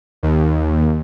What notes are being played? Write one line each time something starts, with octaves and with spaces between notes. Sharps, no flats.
D#2